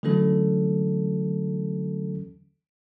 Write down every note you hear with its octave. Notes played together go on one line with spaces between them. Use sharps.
D3 E3 F#3 A3 C#4 A4